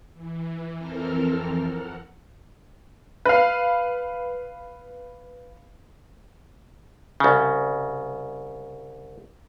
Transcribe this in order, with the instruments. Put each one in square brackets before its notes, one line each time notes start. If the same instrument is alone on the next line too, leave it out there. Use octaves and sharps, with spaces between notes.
[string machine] E3
F2 E3 C4 A4 A#4 F6
F#5
[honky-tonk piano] B4 F5
[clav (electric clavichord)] C2 C#3